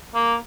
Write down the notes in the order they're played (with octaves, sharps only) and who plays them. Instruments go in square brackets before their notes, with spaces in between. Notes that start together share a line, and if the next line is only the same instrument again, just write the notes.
[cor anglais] A#3